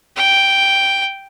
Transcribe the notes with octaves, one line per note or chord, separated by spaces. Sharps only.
G5